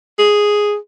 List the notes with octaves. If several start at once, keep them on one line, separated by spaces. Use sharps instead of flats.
G#4